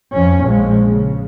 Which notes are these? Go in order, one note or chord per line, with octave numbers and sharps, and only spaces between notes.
F2 C#4
A#1 F3 G#3
C#3